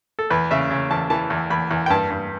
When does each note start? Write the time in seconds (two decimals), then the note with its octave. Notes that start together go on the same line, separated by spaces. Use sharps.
0.19 A4
0.30 E2 B4
0.51 C#3 E5
0.71 C#3
0.91 E2 A5
1.10 E3 A5
1.30 E2
1.50 E2 B5
1.71 E2
1.86 G5
1.90 G2 A5
2.10 G2